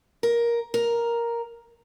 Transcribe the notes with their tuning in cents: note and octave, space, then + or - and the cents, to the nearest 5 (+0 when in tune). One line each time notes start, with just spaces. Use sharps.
A#4 +10
A#4 +5